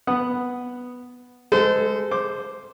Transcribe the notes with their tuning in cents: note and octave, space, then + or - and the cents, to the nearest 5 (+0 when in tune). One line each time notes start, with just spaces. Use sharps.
B3 +0 F#5 +0 D#6 -10
G#3 +0 A4 +0 C5 -35
C5 +0 D6 +0